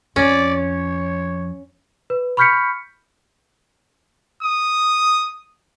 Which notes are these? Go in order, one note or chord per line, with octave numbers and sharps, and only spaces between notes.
F2 C#4 D5
C#5
B4
B5 C#6 F6 G6 B6 C#7
D#6